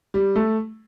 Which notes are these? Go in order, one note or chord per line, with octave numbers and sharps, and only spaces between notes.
G3
A3